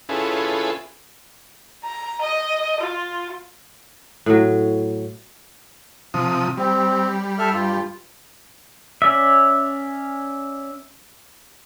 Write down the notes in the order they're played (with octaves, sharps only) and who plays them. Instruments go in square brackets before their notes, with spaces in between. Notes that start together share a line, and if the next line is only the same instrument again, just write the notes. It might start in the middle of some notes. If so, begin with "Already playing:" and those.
[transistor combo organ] C#4 E4 F4 G#4 A4 B4
[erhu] A#5
D#5
F4
[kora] A2 F#3
[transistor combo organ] C3 F3 D#6
[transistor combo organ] G3 [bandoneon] C4
[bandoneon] A4 E5 F6
G2 F4
[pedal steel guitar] C#4 D5 E5